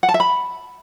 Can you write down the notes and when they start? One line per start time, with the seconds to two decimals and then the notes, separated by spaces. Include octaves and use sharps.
0.03 F#5
0.09 A5
0.14 E5
0.20 B5